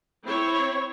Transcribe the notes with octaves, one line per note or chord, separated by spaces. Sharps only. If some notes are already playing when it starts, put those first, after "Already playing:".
C4 E4 C#5